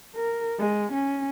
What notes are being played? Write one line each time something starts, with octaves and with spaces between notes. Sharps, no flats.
A#4
G#3
C#4